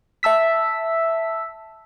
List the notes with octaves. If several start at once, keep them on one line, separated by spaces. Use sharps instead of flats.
E5 A5 E6 B6